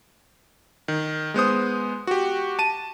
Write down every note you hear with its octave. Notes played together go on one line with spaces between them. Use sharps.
D#3
G#3 B3 C5 D#6
F#4 G4
A5 D#7